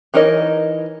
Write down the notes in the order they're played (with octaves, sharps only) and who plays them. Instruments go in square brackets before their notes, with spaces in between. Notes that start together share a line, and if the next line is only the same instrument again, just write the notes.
[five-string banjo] E3 D#4 A#4 C#5 D#5